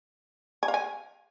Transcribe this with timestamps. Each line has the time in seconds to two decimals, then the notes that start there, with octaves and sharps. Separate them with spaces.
0.63 G#5
0.68 F5
0.74 G#5